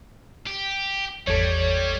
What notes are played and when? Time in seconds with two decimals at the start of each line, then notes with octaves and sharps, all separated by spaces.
0.47 G4
1.27 G#1 E2 G3 A4 C#5